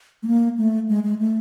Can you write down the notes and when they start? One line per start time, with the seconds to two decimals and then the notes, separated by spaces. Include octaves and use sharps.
0.23 A3
0.27 A#3
0.58 A3
0.89 G#3
1.03 G#3
1.18 A3